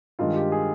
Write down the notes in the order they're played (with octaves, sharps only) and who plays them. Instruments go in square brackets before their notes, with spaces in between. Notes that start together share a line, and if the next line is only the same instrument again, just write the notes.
[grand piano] G2 D#3 G#3 F4
G4
G#4